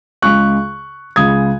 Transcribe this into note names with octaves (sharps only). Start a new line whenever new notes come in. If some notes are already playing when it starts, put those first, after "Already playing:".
C#2 C#3 G#3 C#6 F#6
C#2 C#3 G#3 D#6 G#6